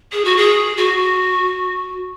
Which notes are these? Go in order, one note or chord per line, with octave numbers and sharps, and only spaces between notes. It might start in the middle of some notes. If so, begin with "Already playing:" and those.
G#4
F#4
G#4
F#4